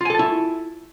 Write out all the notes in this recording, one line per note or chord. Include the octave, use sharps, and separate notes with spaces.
E4 F4 A4 G#5 A5